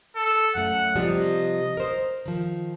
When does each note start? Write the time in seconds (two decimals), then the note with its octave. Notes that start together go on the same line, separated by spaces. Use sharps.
0.16 A4
0.55 F#2 A3 F#5
0.96 C3 F3 G3 D#5
1.77 A#4 C5
2.26 D#3 F3